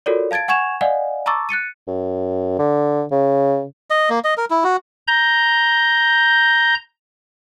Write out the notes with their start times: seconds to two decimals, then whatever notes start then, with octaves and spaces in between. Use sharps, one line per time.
0.06 F4 F#4 A4 A#4 C#5 D5
0.31 F5 A5 G#6 A6 D7
0.48 F#5 G#5 C#6 G#6 E7 F7
0.81 D5 D#5 F5 F#5 G#5
1.26 A5 A#5 C#6 D6 E6 A6
1.49 F#6 A6 C#7 D#7
1.88 F#2
2.59 D3
3.11 C#3
3.90 D#5
4.10 A#3
4.24 D#5
4.37 A#4
4.50 E4
4.64 F#4
5.08 A#5 G6